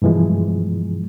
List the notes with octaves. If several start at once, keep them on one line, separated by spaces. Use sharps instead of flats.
G2 B2 E3 F3 G#3